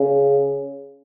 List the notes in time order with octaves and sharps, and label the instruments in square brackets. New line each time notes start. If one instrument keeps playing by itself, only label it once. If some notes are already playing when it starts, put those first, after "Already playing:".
Already playing: [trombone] C#3